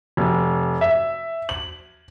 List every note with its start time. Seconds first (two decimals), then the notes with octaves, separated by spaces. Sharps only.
0.17 F1
0.81 E5
1.49 F#7